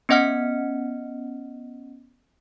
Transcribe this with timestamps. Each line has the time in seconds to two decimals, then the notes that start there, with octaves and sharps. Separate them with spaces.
0.09 B3 C#4 D#5 F#5 F6 C#7